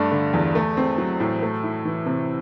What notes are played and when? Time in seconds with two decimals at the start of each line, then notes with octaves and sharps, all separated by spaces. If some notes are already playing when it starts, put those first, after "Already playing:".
Already playing: G2 A3 D4
0.11 D3
0.33 E2
0.55 A3
0.77 C4
0.98 F#3
1.20 A2
1.42 A3
1.63 E4
1.85 E3
2.06 C3